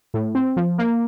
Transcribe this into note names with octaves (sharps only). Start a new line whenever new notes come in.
A2
C4
F3
A#3